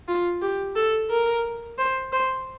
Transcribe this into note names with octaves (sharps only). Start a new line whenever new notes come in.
F4
G4
A4
A#4
C5
C5